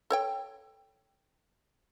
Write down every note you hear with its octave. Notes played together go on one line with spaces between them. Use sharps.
A4 C#5 G5